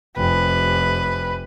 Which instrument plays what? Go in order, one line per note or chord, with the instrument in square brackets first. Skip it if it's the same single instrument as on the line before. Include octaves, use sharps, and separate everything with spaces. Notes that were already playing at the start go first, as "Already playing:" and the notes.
[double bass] F1 [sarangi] B4